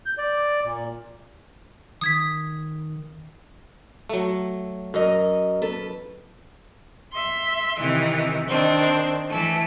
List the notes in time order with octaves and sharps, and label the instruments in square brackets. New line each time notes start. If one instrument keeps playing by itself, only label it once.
[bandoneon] G6
D5
A#2
[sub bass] D#3 [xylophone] D#6 G#6 B6
[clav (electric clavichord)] F#3 A3
[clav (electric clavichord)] F#2 [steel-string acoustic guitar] A#4 D#5
[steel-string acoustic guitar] A4 B4
[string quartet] E5 C6
C3 D#3 E3
D#3 C4 D4
E3 A3